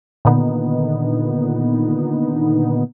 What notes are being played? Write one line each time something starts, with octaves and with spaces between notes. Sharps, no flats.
A#2 D3 D#3 B3 D#4